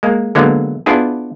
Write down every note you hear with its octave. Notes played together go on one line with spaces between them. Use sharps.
G#3 A#3
D3 F#3 G#3 A#3 B3
B3 D4 E4 F4 G#4